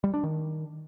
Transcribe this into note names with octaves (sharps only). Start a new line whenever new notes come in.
G3
D4
D#3